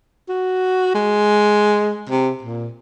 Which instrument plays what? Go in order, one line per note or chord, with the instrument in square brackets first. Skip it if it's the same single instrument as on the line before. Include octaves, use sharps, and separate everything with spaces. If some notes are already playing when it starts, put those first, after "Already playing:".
[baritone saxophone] F#4
G#3
C3
A#2